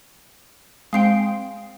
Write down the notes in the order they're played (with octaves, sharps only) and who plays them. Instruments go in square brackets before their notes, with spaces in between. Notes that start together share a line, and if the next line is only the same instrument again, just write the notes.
[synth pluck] G#3 C4 G5 [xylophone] F5 C7 D7